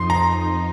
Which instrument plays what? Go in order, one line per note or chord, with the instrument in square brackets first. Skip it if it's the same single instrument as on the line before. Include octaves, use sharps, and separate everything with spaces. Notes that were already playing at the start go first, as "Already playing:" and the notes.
Already playing: [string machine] F2 F3 D#4 [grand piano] C6
[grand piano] A#5